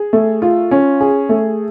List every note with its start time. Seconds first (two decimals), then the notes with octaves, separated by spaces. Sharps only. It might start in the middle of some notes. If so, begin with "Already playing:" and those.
Already playing: G#4
0.13 A3
0.42 F4
0.71 C#4
1.01 G#4
1.29 A3